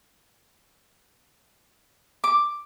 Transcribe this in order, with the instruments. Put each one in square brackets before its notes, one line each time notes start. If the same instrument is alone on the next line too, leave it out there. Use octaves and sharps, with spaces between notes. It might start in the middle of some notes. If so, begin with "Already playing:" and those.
[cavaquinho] D6